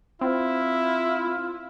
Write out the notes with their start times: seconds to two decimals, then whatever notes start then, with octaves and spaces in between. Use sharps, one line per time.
0.21 C4 E4 F4